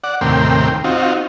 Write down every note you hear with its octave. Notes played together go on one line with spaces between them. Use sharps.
D5 F#5
D#2 A2 C3 A#4 G5 C6
C4 D#4 F4 F#4